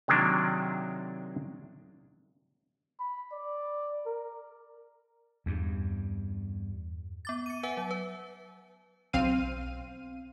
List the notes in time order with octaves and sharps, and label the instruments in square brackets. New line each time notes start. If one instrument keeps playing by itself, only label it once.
[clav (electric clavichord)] C3 D#3 F#3 G#3 A#3 D4
[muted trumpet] B5
D5
A#4
[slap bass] E2 G2
[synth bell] B3 D6 A6
C#7 D#7
B4 E5 F#5 G#5
F#3
B4
[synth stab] B1 C4 F5 D#7